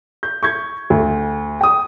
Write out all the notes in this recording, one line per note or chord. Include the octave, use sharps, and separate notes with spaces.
G6
C#6 G6 G#6
D2
G5 D#6